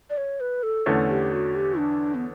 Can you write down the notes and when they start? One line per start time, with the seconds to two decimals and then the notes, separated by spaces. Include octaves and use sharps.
0.10 D5
0.18 C#5
0.40 B4
0.63 A4
0.86 E2 D3 A3 C#4
1.09 G4
1.32 F#4
1.56 G4
1.78 D4
2.15 B3